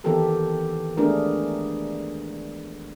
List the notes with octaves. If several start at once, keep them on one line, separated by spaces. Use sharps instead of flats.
D#3 E3 B3 G4 A4 A#4
G#3 A3 B3 D4 G#4 A#4